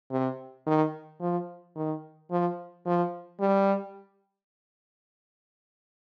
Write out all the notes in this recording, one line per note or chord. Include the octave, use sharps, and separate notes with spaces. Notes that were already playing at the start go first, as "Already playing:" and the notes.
C3
D#3
F3
D#3
F3
F3
G3